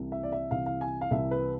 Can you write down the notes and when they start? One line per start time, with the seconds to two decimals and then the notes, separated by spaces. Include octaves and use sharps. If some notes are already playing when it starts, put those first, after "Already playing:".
Already playing: C2 C3 E3
0.12 E5
0.23 D5
0.32 E5
0.51 C2 C3 E3 F5
0.66 F5
0.81 G#5
1.01 F5
1.11 C2 C3 E3 E5
1.31 B4